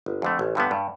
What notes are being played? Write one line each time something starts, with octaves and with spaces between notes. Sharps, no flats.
G1
F2 D3 A3
A1
G2 D3 G3 B3
G2